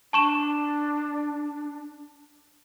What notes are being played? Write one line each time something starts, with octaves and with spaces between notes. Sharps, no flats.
D4 A5 C#6 E7